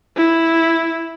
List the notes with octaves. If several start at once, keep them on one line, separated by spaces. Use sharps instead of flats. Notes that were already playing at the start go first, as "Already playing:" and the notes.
E4